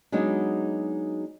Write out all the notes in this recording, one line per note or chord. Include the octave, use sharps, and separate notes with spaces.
F#3 G#3 B3 D4 D#4 F#4